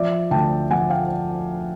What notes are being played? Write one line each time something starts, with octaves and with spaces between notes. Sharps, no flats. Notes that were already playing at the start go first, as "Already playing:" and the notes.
Already playing: F3 D5 E5
D2 G5 A5
F3 F#5 G#5
F5 G5